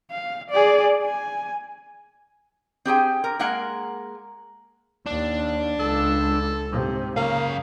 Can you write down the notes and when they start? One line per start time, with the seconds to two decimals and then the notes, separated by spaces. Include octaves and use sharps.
0.11 F5
0.50 G#4 D5
1.02 G#5
2.85 C4 G4 G#4 G5
3.24 A#4
3.39 G#3 A#3 A#4 F5 F#5
5.06 D#2 D4
5.80 C#2 A4
6.72 G#2 C3
7.17 F#2 C#3 A#3 F5